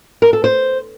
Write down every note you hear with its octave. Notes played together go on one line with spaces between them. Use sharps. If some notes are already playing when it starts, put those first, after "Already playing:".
A#4
A4
C5